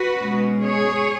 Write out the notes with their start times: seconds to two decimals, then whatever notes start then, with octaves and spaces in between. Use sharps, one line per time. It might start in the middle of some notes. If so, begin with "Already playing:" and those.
Already playing: F#4 B4
0.16 B2 G#3 C#4
0.62 G#4 C#5